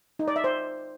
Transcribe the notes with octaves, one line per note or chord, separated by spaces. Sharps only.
D#4
D5
E5
C5